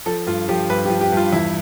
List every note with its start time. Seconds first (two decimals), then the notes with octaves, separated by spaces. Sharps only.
0.06 F3 A4
0.27 G2 F4
0.49 F3 G4
0.70 G2 B4
0.85 G4
0.90 F3
1.01 G4
1.12 G2 F4
1.32 E2 E4